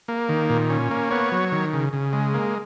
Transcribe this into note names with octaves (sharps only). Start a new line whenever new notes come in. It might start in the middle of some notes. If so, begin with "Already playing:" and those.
A#3
D#3
A#2
C#4
A#3
B3 C#5
F#3
D#3
C#3
C#3
G#3
A#3